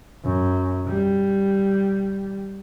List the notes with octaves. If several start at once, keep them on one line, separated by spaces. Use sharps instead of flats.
F#2
G3